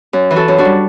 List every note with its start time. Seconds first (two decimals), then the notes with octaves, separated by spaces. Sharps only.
0.13 F#2
0.31 E3
0.36 F#4 A4
0.48 F#2
0.58 D4 F#4
0.65 G3